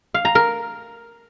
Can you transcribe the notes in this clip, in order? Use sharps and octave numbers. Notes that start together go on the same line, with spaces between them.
F5
A#5
A#4